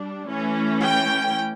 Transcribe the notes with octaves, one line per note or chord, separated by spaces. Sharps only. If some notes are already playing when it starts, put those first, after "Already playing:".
Already playing: G3 D4
E3 A3 C#4
G5